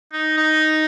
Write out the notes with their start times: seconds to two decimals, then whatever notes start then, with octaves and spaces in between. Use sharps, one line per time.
0.13 D#4
0.37 D#4